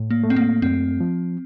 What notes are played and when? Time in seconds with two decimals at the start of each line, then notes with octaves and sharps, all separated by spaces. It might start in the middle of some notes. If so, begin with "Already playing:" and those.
Already playing: A2
0.10 A#3
0.24 A3
0.30 C4
0.36 A#3
0.62 F#2 C4
1.00 F3